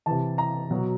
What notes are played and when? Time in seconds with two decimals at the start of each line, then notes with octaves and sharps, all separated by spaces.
0.06 C3 E3 A5
0.38 A#5
0.71 B2 F#3